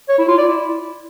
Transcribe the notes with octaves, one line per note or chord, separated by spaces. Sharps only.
C#5
E4
F4
D5
E4